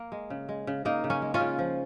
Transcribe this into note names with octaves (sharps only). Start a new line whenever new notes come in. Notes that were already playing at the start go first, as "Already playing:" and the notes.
Already playing: A#3
G#3
C#3
G#3
C#3
C#3 A#3 D#4
C#3
C#4
G#3
C#4 F4
C#3
F3